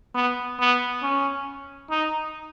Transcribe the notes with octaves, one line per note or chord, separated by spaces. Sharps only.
B3
B3
C#4
D#4